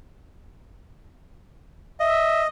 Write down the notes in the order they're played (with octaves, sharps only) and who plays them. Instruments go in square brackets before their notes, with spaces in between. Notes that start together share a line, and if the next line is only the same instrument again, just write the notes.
[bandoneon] D#5 [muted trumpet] E5